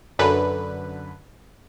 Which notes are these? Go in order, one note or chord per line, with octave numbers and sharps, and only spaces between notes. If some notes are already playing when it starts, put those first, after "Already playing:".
F#2 D3 B4